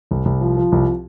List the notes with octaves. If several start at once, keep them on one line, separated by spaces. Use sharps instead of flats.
C2
C2
F3
F3
C2